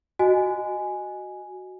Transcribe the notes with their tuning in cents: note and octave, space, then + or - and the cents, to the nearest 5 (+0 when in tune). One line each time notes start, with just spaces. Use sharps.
F#4 +0 D#5 -10 G#5 +0